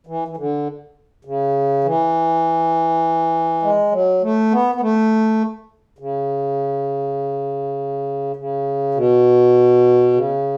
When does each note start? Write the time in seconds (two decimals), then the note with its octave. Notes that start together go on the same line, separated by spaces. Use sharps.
0.07 E3
0.28 E3
0.37 D3
1.25 C#3
1.84 E3
3.62 G#3
3.91 F#3
4.22 A3
4.51 B3
4.75 B3
4.81 A3
5.99 C#3
8.36 C#3
8.95 B2
10.13 C#3